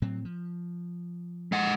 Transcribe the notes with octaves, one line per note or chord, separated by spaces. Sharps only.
A2 F#3 C4
F3
G#3 F#5